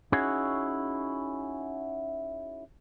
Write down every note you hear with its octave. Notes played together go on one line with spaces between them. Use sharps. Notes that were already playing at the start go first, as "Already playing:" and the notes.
C#4 D#4 E4 F#4 G#4 C#5